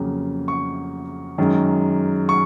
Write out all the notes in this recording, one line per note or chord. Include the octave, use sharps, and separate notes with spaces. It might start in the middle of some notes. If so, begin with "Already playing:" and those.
Already playing: F2 C#3 F#3 A#3
C#6
F#2 D#3 G#3
C#6